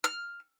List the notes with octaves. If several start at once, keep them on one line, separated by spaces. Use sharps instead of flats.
F6